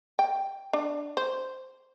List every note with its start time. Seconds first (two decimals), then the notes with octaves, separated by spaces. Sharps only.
0.19 G5
0.73 D4
1.17 C5